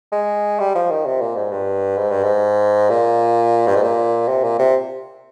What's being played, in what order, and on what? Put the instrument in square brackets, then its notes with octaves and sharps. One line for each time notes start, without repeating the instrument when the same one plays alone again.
[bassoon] G#3
G3
F3
D#3
C3
A#2
G#2
G2
G#2
G2
G#2
A#2
G2
G#2
A#2
C3
A#2
C3